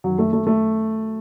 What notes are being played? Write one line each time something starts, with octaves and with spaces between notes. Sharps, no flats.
F#2 D#3 F#3
A3
A3
A3